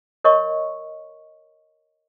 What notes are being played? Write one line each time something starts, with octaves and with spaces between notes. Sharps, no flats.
A#4 C#5 D#5 C#6